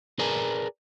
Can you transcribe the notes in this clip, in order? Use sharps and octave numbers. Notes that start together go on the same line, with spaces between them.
G#4 A#4 B4 D5 G#5 A#5